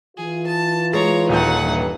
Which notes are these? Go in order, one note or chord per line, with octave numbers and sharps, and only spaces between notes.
E3 F4 G#4
A5
G#3 C#5 A#5
D#1 D#2 D#4 F#5 G6
G2 E3